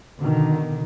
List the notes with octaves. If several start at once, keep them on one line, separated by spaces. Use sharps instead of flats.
B2 D3 D#3